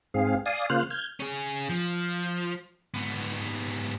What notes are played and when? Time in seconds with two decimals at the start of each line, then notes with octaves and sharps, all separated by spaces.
0.14 G#2 C4 G#4 F5
0.46 D5 F5 G#5 D#6
0.70 C#3 A#3 F4 C5 F6 F#6
0.90 F6 G6 G#6
1.20 C#4 G#4
1.70 F3
2.94 G#2 B3